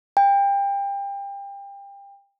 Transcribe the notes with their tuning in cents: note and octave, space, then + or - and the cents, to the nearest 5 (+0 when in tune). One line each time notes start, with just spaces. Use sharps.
G5 +30